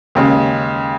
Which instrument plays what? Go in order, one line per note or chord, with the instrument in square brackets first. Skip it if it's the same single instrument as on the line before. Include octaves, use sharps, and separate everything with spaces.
[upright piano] D#2 C#3 G#3